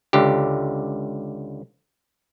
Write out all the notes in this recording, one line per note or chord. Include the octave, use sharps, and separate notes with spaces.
C#2 D3 G4